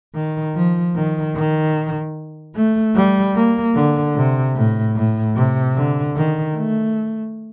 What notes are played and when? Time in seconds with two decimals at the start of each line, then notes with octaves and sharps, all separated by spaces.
0.15 D#3
0.55 F3
0.95 D#3
1.36 D#3
2.55 A3
2.96 G3
3.35 A#3
3.75 D3
4.16 C3
4.56 A2
4.96 A2
5.36 C3
5.76 D3
6.16 D#3
6.56 A3